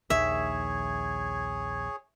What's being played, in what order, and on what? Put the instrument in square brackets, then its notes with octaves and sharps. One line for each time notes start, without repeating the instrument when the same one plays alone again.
[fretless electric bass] A#1 D#2 D#3 [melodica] G#4 C#5 [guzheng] E5